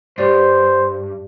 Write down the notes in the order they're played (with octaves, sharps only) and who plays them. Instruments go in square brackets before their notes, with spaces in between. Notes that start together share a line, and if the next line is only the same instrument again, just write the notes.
[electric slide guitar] G2 [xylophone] G4 D5 C7 [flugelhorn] C5